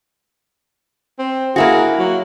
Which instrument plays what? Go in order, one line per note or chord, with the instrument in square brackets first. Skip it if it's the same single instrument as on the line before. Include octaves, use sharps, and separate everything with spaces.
[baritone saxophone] C4
[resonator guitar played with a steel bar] A#3 E4 F#4 [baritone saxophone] G#4
[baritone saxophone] F#3